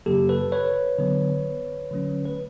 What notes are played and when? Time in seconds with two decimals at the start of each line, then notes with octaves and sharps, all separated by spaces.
0.06 F#2 C#3 F#3 A#3 G4 A4
0.29 A4 B4
0.52 B4 C#5
0.99 D3 F#3 B3
1.91 D3 F#3 A3 C#4
2.25 B4